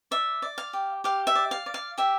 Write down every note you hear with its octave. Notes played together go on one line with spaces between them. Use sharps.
D5 E5
D5
F5
G4
G4 F5
E5
D5
F5
D5
F5
G4 E5